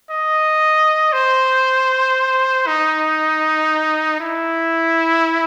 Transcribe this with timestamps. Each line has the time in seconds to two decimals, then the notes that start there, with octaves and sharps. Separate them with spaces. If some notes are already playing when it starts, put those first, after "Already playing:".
0.11 D#5
1.13 C5
2.67 D#4
4.20 E4